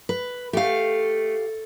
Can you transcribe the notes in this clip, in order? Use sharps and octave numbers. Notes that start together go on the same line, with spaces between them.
B4
A3 G4 F5